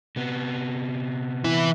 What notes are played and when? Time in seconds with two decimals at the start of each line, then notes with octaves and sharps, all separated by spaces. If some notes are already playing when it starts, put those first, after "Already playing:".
0.16 C3 B3
1.44 E3 E4